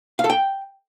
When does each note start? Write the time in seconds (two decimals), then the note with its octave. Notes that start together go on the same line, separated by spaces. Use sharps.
0.19 F5
0.24 A4
0.30 G5